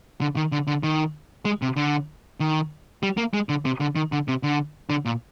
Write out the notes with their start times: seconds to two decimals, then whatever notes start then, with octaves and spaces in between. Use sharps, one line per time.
0.21 D3
0.36 D#3
0.52 D3
0.67 D3
0.83 D#3
1.45 G#3
1.62 C3
1.76 D3
2.40 D#3
3.03 G3
3.17 A#3
3.34 G#3
3.49 D3
3.65 C3
3.81 D3
3.96 D#3
4.12 D3
4.28 C3
4.43 D3
4.90 D3
5.05 A#2